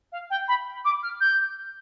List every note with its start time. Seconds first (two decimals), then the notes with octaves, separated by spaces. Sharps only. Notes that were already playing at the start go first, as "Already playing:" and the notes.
0.12 F5
0.30 G5
0.48 B5
0.85 D6
1.03 F6
1.20 G6